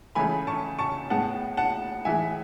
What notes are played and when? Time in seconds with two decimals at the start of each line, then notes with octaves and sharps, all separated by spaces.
0.15 C#2 C#3 E3 A3 G#5 B5
0.47 A5 C#6
0.79 A5 C#6
1.10 A2 G#3 B3 F#5 A5
1.57 F#5 A5
2.05 A2 E3 G#3 E5 G#5